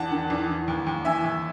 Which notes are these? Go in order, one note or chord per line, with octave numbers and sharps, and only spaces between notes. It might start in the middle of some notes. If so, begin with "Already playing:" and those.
Already playing: E2 F#5 A5
D#3
E2
E3
D#2
D#2
E3 E5 G#5
D#2